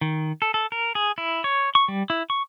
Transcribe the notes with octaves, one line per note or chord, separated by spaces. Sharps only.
D#3
A4
A4
A#4
G#4
E4
C#5
C#6
G3
E4
C#6